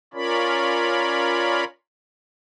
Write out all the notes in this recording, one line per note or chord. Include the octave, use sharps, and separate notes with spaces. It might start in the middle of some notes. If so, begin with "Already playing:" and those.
C#4 F4 A#4 C#5 D5 B5